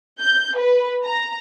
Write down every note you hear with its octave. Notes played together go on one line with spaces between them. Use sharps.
G6
B4
A#5